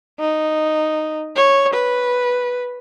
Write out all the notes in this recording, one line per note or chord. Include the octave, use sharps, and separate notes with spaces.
D#4
C#5
B4